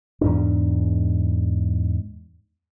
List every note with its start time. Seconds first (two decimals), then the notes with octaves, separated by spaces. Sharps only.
0.21 E2 G#2 D4